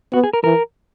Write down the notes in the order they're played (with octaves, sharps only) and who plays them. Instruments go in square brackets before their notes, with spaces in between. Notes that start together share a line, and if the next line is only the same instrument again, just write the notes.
[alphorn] B3 [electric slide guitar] F#4
[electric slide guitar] G#4
A#4
[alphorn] E3 [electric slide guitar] A#4